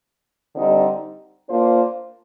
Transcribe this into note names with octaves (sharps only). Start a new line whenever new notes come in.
D3 G3 C4 D#4 G4
A#3 D4 F4 C5